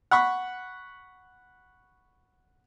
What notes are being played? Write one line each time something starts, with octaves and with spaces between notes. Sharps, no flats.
F#5 B5 C#6